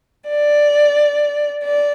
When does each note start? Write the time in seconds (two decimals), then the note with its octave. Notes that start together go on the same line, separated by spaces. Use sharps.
0.29 D5
1.62 D5